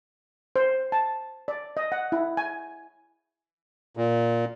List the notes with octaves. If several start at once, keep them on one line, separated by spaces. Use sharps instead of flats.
C5
A5
D5
D#5
F#5
E4
G#5
A#2